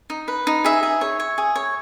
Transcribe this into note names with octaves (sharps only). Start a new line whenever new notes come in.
D#4
B4
D#4
G#4 E5
G#4
C#5
C#5
G#4
C#5